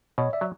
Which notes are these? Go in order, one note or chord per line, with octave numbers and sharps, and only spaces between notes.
B2 C#5 D#5
D5 E5
F#3